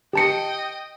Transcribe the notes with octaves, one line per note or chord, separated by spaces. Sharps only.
G4 D#5 G5 A5 C#7